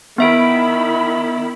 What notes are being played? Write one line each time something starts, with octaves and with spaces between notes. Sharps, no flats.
D#3 B3 E4 E5 B5 D7